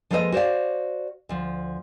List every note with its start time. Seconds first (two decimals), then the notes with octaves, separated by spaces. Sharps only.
0.11 F3 G#3 A#3 A4 B4 D#5
0.32 F#4 C5 D5 F5
1.29 D2 F3